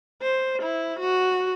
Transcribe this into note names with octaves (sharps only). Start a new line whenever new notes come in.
C5
E4
F#4